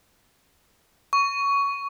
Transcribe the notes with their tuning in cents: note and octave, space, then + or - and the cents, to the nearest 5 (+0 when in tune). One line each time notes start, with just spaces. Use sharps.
C#6 +15